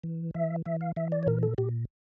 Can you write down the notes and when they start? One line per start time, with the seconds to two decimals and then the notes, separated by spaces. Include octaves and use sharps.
0.03 E3
0.34 E3 E5
0.66 E3 E5
0.81 F5
0.96 E3 E5
1.12 D5
1.23 C#5
1.27 A#2 A#4
1.43 A4
1.58 A#2 G4